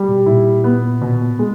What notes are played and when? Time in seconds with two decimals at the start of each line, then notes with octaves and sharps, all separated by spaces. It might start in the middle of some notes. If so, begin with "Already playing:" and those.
Already playing: G3
0.08 B2
0.26 A#2 E4
0.64 B3
1.02 B2
1.39 G#3